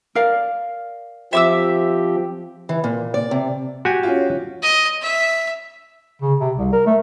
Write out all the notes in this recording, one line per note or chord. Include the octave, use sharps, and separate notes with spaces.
A#4 D5 F5
F3 C4 G4 E5 D6 E6
E3
A#2
D5
C3
F#4 G4 G#5
C#4 F4
D#5
E5
C#3
C3
C2
A#4
A3